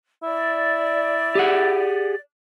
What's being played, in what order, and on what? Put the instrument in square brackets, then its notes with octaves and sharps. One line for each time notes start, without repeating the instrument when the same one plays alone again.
[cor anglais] E4 [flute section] D5
[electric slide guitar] G4 G#4 F#5